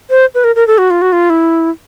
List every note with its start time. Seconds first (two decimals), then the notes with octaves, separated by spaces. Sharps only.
0.10 C5
0.35 B4
0.44 A#4
0.56 A#4
0.67 A4
0.78 F#4
0.90 F4
1.02 F#4
1.12 F4
1.30 E4